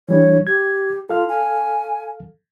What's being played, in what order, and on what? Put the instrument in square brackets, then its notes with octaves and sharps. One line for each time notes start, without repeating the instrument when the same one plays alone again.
[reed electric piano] E3 G3 D4 [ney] C#5
[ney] G4 [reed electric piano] G#6
[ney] F4 [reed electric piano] A4 F5 F6
[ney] G#5